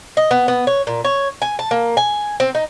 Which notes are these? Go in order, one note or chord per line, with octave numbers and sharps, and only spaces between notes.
D#5
B3
B3
C#5
A#2
C#5
G#5
A5
A#3
G#5
C4
D#4